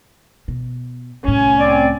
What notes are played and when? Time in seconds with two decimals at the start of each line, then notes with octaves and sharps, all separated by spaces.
0.48 B2
1.25 C2 A2 C#4 G#5
1.58 C4 D5